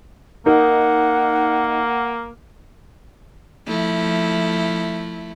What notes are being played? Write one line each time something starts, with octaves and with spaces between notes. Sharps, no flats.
A#3 D#4 A#4 F#5
F3 A3 E4